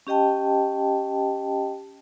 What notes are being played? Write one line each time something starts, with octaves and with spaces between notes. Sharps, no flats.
C#4 G4 D#5 G5 A5